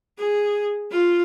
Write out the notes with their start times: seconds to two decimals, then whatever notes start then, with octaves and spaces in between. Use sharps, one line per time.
0.18 G#4
0.91 F4